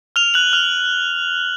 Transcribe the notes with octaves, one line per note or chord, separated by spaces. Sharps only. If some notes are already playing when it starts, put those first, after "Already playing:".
F6 F7
F#6 F#7
F6 F7